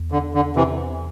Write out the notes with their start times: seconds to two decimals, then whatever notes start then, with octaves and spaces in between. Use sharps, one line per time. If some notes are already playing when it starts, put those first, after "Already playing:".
Already playing: E2
0.12 D3
0.34 D3
0.56 C3 E3